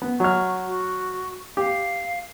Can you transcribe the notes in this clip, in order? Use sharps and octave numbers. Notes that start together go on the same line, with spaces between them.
B3
F#3 C#6 F6
F#4
G4 F5